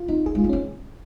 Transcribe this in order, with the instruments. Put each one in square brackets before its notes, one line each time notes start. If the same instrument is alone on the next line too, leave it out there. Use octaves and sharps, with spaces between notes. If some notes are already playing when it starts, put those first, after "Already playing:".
Already playing: [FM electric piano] F4
[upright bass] C4 [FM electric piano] D#4
[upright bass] C#4 [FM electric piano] G#4
[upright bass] G#3
[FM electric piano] F4
[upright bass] A#3
[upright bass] C4 [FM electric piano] C#4